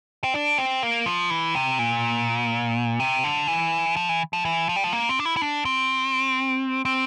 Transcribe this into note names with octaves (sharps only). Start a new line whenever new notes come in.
C4
D4
C4
A#3
F3
E3
C3
A#2
C3
D3
E3
F3
E3
F3
E3
F3
G3
F3
A#3
C4
D4
E4
E4
D4
C4
C4